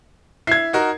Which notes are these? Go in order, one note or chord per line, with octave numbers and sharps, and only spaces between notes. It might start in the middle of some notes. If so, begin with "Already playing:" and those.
E4 G#6 C7
D#4 F#4 A#4